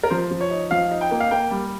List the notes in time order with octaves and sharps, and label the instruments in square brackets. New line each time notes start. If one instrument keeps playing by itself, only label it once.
[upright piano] A#4
F3 C5
F3
C#5
D#4
F3 F5
D#4
G5
A#3
F5
A#3 G5
G3